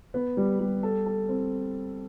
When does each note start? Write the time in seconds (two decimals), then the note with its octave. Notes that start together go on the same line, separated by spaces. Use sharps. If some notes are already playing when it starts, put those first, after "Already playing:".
0.14 B3
0.37 G3
0.60 G3
0.83 A4
1.06 A4
1.29 C4